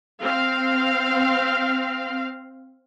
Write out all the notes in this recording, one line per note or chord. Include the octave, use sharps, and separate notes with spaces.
C4 F5